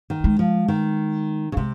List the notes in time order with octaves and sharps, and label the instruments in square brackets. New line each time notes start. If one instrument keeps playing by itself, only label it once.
[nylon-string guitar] D#3
[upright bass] G#3
[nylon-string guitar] F3
D#3
C#3
[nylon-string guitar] C3 [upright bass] G#3